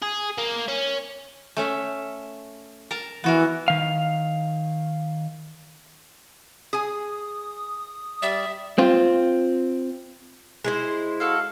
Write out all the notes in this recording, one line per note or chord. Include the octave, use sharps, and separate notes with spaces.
G#4
A#3
C#4
A3 C#4 E5
A#4 A5 A#5
E3 B3 F#4 A#4
D#3 F5
G#4 G#5 D#6
G3 D5 E5
C4 F4
G#3 E4 C5
F#4 A4 F5